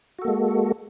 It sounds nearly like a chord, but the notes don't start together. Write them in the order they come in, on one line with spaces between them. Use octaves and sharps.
F#4 A4 A#3 G#3